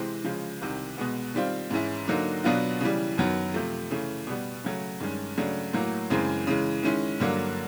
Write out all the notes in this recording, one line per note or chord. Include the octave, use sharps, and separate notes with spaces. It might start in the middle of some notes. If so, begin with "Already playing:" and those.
Already playing: C3 E3 G#3 C4
C#3 F3 G#3
C2 C3 D#3
B2 G#3 B3
D#3 G3 C4 F4
G#2 E3 G#3 C#4 E4
D3 F#3 A#3 D#4
B2 F#3 B3 D4 F4
C#3 E3 G3
F#2 D#3 F#3 B3
C3 F3 A3
C#3 E3 A3
B2 G3 B3
C#3 F#3 A3
G2 D#3 G#3 C#4
C#3 F#3 A3 D4
A2 F#3 A#3
F#2 C#3 E3 G#3 C4
C#3 E3 G#3
D#3 G#3 C#4 E4
G2 D3 F#3 A#3